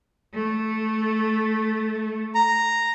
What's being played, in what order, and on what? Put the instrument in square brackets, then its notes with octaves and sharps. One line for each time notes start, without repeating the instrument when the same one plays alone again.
[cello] A3
[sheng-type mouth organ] A#5